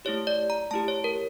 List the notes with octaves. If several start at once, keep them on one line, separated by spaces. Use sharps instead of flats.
A3 E4 G4 C#5
D5
A#5
A3 E4 G4 A5
C#5
A#4